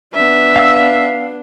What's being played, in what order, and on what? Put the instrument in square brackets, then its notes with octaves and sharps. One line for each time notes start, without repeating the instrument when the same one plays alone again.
[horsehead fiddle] B3 D4 [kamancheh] E5
[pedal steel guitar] F5 E6